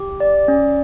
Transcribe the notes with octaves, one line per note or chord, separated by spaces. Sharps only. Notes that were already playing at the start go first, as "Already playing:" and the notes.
Already playing: G4
D5
C#4